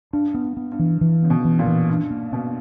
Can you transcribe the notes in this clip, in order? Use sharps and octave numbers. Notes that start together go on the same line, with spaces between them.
G2 D4
B3
G2
B3
G2
E3
E3
C#3 B3
B2
E3
A#2
E3
G2 C#4
A#3
B2 C#4